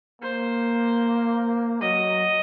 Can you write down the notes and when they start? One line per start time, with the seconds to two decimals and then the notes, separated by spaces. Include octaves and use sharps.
0.22 A#3 C5
1.81 F#3 D#5